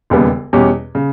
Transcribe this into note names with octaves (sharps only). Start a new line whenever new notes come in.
E1 D#2 C#3 G3 B3
E2 B2 G3 C#4 G4
C#3